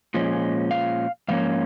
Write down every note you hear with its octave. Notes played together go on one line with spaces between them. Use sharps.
A#2 F3 G#3 C#4
F5
G#2 F3 A#3 C#4 F5